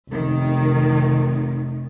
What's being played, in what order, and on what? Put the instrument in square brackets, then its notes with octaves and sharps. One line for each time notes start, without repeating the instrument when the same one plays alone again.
[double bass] F1 [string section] D#3